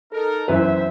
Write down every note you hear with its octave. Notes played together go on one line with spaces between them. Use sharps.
D#4 A4 A#4
B1 F#2 E3 B4 C5 E5